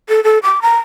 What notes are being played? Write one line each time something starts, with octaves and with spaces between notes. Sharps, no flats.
A4
A4
D6
A#5